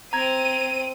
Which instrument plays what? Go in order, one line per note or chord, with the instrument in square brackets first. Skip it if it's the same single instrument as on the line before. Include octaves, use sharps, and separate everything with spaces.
[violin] C4 D#7 [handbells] A#5 G#6